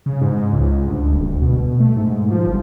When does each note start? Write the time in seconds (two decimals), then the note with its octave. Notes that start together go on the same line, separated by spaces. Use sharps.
0.06 C#3
0.21 G#2
0.53 C#2
0.87 D2
1.13 D#1
1.28 D2
1.42 B2
1.80 A3
1.97 G#2
2.31 F3
2.47 G1